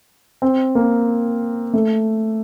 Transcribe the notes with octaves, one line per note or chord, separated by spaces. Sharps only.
C4
A#3
A3